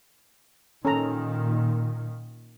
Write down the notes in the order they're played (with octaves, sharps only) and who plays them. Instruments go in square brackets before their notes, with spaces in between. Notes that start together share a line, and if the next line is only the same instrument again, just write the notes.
[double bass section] A#2 D#3 [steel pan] C#4 A4 A#5